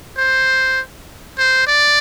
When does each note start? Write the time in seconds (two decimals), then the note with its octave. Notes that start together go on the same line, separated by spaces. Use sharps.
0.18 C5
1.38 C5
1.67 D5